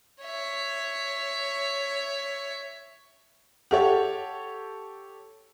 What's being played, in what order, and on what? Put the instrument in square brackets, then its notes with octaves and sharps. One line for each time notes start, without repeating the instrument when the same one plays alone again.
[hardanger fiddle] C#5 E5
[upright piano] G4 A4 C#5 [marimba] F#5